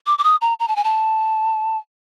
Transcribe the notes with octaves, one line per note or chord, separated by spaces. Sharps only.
D6
D6
D#6
A#5
A#5
A5
G#5
A5